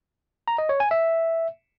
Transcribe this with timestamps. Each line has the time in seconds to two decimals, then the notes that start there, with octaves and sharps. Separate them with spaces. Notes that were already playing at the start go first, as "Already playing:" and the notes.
0.48 A#5
0.58 D#5
0.69 C#5
0.80 G#5
0.91 E5